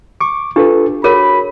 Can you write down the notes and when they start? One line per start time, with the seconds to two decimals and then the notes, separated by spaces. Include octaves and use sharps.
0.21 C#6 D6
0.56 D4 F4 G4 A4 B4
1.04 F#4 G#4 A#4 C#5 B5